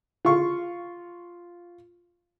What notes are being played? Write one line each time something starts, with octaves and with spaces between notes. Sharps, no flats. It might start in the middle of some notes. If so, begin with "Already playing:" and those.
F4 F5 C#6